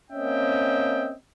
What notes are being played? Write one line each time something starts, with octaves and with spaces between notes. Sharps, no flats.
A#3 C4 C#4 D#5 E5 G5